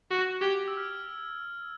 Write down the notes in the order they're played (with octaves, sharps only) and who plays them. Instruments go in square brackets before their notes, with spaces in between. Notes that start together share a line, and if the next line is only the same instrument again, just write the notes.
[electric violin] F#4
[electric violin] G4 [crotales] G#6
[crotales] E6
F6